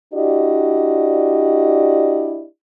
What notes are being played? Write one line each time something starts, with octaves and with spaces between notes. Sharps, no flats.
D4 E4 F#4 G4 D5 D#5